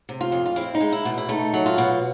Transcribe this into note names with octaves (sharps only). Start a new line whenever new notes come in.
C3
F4
F2
F4
C4 E4
D#4
G#3
E4
B2
E4
A3 D#4
F#3
F4
B2